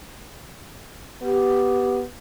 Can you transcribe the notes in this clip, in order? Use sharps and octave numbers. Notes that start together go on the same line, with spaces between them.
B3 G4